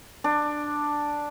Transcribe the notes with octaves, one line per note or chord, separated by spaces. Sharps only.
D4